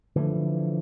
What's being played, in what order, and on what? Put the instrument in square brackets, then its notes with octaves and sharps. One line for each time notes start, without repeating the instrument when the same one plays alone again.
[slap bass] D3 E3 F3 A3